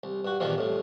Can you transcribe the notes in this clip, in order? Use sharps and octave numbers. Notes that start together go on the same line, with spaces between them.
C2
G2 F#4
E2 G2 A#2 D#3 F3 A#3
C2 A2